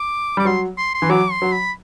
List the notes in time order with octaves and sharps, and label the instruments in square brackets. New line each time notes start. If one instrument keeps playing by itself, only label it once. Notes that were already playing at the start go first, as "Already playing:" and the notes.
Already playing: [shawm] D6
[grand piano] G3 [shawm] D6
[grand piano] F#3 [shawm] C6
[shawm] C6
C6
[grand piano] E3
[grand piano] F#3 [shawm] D6
[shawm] C6
[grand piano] F#3
[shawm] B5